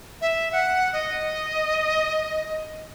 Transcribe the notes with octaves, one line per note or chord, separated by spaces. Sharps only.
E5
F#5
D#5